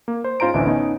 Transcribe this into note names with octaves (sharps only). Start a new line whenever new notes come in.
A#3
C5
G#2 C#4 F4 C5 A#5 D7
A1 D2 E3 D4 E5
B3 C#4 D#4